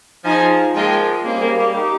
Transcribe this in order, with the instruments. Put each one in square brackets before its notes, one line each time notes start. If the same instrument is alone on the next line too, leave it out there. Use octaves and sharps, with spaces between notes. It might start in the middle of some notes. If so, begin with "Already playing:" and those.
[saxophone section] F3 [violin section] D#4 G#4 D#5 G#5
[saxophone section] F3 G#3 [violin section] A#3 F4 A#4 D#5 G5
[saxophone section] G3 A#3 [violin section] C#4 G#4 C5
[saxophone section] G3 A#3
G3 A#3
D#4 G4